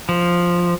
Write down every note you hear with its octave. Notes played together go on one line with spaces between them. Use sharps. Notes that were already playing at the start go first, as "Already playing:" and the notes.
F3